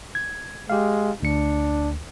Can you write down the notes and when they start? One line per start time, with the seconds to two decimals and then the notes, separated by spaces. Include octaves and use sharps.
0.15 G#6
0.70 G#3 G4 F5
1.23 D2 D4 C#7